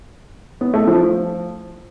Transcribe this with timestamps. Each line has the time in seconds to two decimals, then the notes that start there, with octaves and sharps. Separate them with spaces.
0.61 B3
0.74 A3
0.87 F3